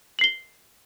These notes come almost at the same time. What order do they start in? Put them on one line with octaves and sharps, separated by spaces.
F#7 C7 G7